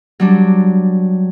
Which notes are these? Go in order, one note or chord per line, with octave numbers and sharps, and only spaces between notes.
F#3 G3 D4